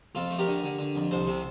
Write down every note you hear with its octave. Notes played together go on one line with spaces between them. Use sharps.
F2 F4 A4
A3
G4 A#4
D3
D3
D3
F2
C2 A4 C5
C3